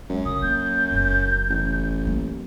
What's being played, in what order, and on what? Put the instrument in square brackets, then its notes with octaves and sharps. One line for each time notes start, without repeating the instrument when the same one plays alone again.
[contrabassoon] F#2 [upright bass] G#3
[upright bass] C#3 [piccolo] D#6
[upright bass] A#3 [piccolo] G6
[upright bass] F#1 B3
[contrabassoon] A1
[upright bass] F#3 A#3